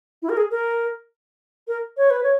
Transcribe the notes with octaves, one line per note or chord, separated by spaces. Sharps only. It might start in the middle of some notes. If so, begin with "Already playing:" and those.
E4
A#4
G#4
A#4
A#4
C#5
B4
C#5